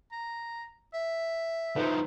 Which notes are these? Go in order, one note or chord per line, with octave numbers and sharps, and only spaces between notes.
A#5
E5
D#3 F3 B4 C5